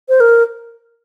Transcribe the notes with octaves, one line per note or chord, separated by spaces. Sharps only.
C5
A#4